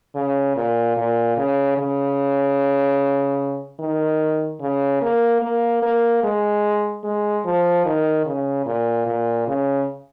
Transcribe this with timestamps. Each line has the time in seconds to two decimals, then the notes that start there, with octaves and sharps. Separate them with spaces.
0.15 C#3
0.56 A#2
0.97 A#2
1.37 C#3
1.78 C#3
3.79 D#3
4.61 C#3
5.02 A#3
5.42 A#3
5.83 A#3
6.24 G#3
7.04 G#3
7.45 F3
7.86 D#3
8.26 C#3
8.66 A#2
9.07 A#2
9.48 C#3